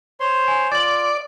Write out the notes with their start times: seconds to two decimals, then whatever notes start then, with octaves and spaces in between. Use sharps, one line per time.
0.20 C5 C#5 C6
0.48 G#5
0.72 F4 D5 A6 F#7